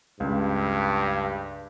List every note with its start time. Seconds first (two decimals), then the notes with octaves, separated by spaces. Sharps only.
0.20 C#2 G2